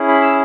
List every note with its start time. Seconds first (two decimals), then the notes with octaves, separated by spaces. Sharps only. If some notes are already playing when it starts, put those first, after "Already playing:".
Already playing: C#4 E4 G#4
0.08 B5
0.22 E6